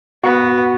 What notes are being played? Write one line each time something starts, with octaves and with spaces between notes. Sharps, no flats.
B3 F#4